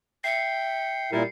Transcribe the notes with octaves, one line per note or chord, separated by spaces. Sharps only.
E5 G5 C7 C#7
A#2 G3 E4 A#4